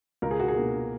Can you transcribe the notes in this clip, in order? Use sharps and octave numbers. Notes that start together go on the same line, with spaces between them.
C#2 A#4
G#4
F#4
G#4
B2 A#3